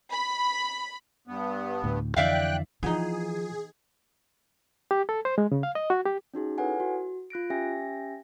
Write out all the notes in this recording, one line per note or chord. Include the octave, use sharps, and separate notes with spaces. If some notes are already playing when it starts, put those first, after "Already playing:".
B5
G2 B3
D2 A2
F2 D3 E3 D5 E5 F5 G5 F#6
E3 F3 B3 D#4 F4 G#4
G4
A4
C5
G#3
C#3
F5
D#5
F#4
G4
C#4 D#4 F#4 G#4
E4 A4 B4 C#5 F#5 G#5
F#4
F4 F#6 A#6 D7
C#4 G4 E5 G5 G#5 A#6